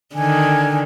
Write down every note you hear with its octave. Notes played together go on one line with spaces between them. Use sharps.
D3 D#3 G#5